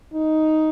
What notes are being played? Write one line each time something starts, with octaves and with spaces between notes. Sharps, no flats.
D#4